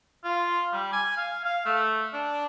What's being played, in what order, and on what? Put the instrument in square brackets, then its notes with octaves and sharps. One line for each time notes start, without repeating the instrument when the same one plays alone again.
[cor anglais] F4
G3
G#5
F5
F5
A3
D4